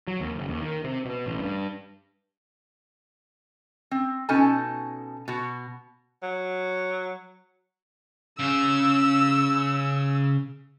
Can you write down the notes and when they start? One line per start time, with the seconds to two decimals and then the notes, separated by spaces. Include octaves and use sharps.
0.07 F#3
0.20 D#2
0.36 F#1
0.48 D#2
0.62 D#3
0.84 C3
1.05 B2
1.26 A1
1.39 G2
3.91 C4
4.29 B2 C#4 D#4 A4 G#5 A5
5.28 B2 F#4
6.23 F#3
8.39 C#3 F5 E6